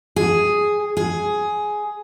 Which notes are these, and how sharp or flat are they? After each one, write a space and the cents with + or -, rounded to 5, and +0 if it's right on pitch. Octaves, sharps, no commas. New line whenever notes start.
G#4 +0
G#4 +10